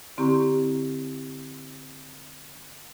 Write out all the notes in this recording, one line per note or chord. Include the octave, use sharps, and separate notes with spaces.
D3 C4 E4 G4 A#5 C#6